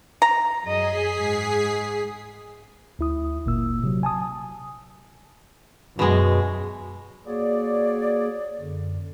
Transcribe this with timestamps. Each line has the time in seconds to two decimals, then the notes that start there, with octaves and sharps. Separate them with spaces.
0.22 A#5
0.63 F#2 G#4 D#5 B6 C7
1.19 G#2
2.99 D2 E4 D#6
3.46 G1 A#2 A#3 E6
3.83 C3 F#3
4.03 G#5 A5 D#6
5.99 F#2 B2 G#3
7.27 A#3 F#4 G#4 C#5 D5
8.60 F#2 D3